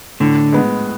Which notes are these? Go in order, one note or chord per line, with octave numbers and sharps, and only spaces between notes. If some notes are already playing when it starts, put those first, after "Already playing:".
A2 D3
G#3 B3